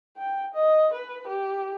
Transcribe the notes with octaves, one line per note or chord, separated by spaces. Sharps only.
G5
D#5
B4
G4